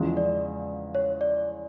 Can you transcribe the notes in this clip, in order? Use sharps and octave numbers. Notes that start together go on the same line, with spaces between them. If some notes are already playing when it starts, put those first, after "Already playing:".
Already playing: E2 C#3 F3 G#3
D5
C#5
D5